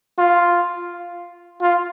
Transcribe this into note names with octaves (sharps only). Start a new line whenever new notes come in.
F4
F4